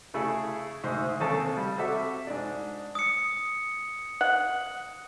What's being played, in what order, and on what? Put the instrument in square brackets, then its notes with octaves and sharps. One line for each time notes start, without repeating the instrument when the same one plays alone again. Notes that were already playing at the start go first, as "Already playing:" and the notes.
[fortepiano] C#3 A3 E4 G#4 A4
D2 G#2 C5
D#2 C#3 C4 C#4 A4 A5
G3
C4 F#4 A4 E5 D6
G#2 D4
[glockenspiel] D#6 C#7
[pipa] F#5